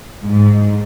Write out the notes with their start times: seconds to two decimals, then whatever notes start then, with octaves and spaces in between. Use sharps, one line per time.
0.23 G#2